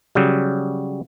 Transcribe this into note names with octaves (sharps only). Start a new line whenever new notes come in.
C#3 F#3 G3